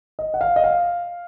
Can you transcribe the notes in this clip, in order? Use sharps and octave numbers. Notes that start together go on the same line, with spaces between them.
D#5
F#5
F5
D#5
F5